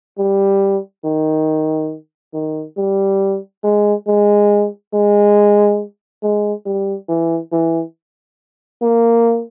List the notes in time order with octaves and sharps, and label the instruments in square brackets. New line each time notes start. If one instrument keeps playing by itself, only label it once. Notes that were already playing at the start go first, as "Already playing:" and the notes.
[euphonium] G3
D#3
D#3
G3
G#3
G#3
G#3
G#3
G3
E3
E3
A#3